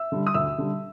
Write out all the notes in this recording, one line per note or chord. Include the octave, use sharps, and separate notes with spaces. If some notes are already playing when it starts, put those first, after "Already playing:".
Already playing: E5 E6
D3 G3
D#6
D2 E5 E6
D3 G3